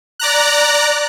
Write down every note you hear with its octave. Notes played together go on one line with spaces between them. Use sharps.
D5 A#5 F#6